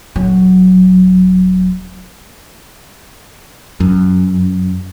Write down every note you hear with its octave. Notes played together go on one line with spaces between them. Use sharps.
D#1 F#3
F#2